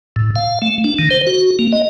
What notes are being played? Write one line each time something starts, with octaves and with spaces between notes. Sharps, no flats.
A2
F5
A3
D4
D#3
C5
F#4
A#3
D#5